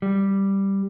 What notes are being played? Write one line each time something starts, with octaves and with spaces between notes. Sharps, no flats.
G3